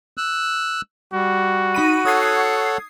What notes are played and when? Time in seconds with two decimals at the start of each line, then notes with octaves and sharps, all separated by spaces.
0.17 E6 F#6
1.13 G3 F#4
1.74 D#4 B5 D#7
2.05 A4 C#5 F#5 D#6 G#6 C7